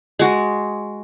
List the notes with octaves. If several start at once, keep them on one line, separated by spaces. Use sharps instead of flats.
G#3 F#4